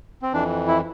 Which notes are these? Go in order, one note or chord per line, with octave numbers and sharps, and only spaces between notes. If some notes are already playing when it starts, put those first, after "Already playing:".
C4
F2 E3 D4
E4